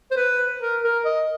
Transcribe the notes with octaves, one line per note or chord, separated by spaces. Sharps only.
C5
B4
A#4
A#4
D#5